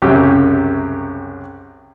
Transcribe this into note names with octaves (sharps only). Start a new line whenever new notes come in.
C2 F#2 C#3 C#4 G4